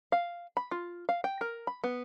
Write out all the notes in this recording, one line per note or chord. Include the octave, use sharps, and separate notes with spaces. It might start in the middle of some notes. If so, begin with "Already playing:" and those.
F5
B5
F4
F5
G5
A#4
B5
B3